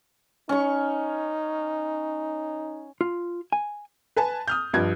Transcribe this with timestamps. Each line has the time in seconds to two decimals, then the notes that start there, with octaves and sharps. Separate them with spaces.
0.49 C#4 D#4 C#6
3.01 F4
3.52 G#5
4.17 B4 G#5 A5
4.48 D#6 F6 G6
4.74 G2 F3 D#5 G#6